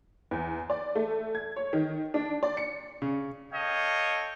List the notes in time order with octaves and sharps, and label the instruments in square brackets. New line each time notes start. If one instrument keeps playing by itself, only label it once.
[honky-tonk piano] E2
D5
A3
G#6
C#5
D#3
D4
D5
C#7
[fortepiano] C#3
[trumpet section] A4 C#5 D#5 F5 G5